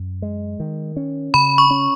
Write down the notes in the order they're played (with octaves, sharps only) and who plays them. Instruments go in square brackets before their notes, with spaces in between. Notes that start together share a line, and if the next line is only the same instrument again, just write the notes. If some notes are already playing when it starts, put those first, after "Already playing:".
Already playing: [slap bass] F#2
G#3
D#3
C#4
[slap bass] C#3 [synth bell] B5
[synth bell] C#6
[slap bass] C#4